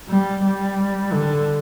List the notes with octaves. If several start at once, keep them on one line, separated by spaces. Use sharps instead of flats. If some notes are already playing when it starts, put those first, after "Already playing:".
G3
G3
D3